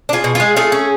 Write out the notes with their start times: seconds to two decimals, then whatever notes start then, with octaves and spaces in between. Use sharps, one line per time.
0.09 D4
0.13 F4 G#4
0.24 B2
0.35 G#3 F4 G#4
0.57 A3 F4 G#4
0.72 C#4